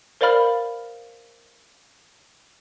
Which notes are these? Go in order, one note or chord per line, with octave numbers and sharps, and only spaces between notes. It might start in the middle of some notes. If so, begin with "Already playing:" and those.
A#4 C5 D5 F5 B5 F6